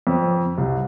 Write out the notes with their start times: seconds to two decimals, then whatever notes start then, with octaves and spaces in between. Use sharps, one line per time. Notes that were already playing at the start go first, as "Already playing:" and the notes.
0.07 F2
0.58 C2